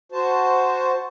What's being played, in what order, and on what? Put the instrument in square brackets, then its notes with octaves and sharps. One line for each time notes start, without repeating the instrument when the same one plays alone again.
[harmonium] F#4 C5 A5